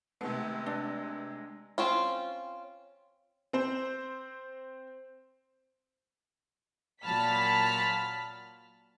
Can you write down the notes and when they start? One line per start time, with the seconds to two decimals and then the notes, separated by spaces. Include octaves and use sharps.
0.21 C3 D#3 G#3 A3 B3
0.66 D4
1.78 C4 C#4 F4
3.53 C4 C5
7.03 A#2 F#3 A5 B5 F6 B6